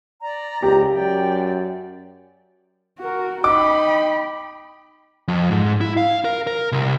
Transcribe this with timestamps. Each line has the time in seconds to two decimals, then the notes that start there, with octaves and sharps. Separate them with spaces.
0.21 D5 A#5
0.62 C#2 G4
0.93 F#2 D5 G5
2.99 F#4 A#4
3.44 D#4 G5 B5 D6
5.28 F2
5.51 G#2
5.81 E4
5.97 F5
6.25 A#4
6.47 A#4
6.72 C2